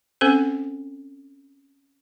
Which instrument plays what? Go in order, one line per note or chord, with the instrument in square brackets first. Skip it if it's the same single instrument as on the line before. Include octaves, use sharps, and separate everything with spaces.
[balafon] C4 C#4 A4 C5